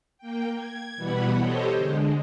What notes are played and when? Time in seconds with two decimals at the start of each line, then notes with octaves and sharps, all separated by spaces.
0.18 A#3 G5
0.53 G#6
0.96 B2 E3 G3 B3 F#5 B5
1.37 G4 A4 C5 C#5 D#5 G5
1.75 D3 G#3